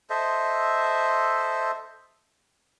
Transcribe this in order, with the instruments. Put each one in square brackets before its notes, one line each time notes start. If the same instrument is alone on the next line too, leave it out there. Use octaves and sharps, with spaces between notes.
[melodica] A4 C5 D#5 E5